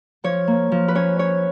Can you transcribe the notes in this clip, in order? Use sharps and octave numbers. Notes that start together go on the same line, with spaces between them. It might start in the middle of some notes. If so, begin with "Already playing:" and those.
F3 C#5
A#3
F3
B4
C#4 C#5
C#4 C#5